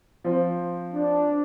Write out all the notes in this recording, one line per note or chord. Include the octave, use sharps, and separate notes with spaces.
F3 C4
D4